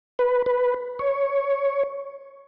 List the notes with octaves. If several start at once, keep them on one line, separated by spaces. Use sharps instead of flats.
B4
B4
C#5